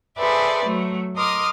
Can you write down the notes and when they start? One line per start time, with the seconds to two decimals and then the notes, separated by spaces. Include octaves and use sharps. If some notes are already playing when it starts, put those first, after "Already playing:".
0.18 G#4 A4 B4 C5 D5 E5
0.66 F#3 A3
1.16 A#4 D#5 C6 D6 D#6 F6